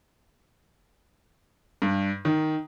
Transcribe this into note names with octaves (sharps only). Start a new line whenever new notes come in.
G2
D#3